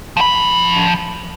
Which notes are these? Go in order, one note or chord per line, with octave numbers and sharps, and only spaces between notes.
F3 B5